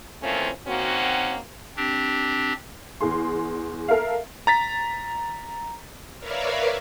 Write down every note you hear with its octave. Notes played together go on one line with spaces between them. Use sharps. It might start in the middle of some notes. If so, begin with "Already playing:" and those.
E3 F3 A3 A#3 C4 C#4
D#3 A#3 C4 C#4 F#4
C4 D4 G4
E2 G#4 C6
A4 A#4 E5 F5
A#5 A6 B6
A#4 B4 C#5 D5 E5 F5